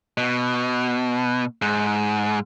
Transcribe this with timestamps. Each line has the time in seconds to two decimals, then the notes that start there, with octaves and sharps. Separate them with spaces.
0.17 B2
1.62 G#2